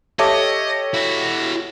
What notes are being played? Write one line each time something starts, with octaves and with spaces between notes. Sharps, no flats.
G4 A4 C#5 D#5 E5 A5 D6
E4 F#4